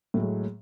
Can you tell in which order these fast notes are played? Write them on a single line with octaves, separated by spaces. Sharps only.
A2 F#3 G#3